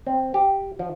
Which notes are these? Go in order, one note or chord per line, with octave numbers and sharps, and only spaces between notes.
C4
G4
F3